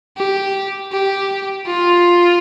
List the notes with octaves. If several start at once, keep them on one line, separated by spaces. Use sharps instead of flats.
G4
G4
F4